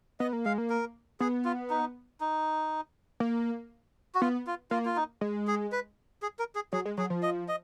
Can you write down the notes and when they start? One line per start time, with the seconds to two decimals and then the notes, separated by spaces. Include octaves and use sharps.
0.20 B3 D#5
0.33 A#3
0.45 G#3 F5
0.58 A#3
0.70 A#4
1.20 B3 G#4
1.45 F4
1.70 D#4
2.21 D#4
3.20 A#3
4.15 F#4
4.21 B3 F4
4.47 F4
4.71 A#3 F4
4.85 F4
4.96 D#4
5.21 G#3
5.47 G#4
5.72 B4
6.22 G#4
6.39 A#4
6.55 G#4
6.73 F#3 G#4
6.86 G#3
6.98 F#3 G#4
7.10 F3
7.23 D#5
7.48 D#5